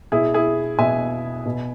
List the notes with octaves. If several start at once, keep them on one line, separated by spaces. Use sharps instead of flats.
B2 E4 G#4
E4 G#4
B2 E5 G#5
B2